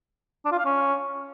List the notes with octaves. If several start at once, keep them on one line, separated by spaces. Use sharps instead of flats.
D4
F4
F5
C#4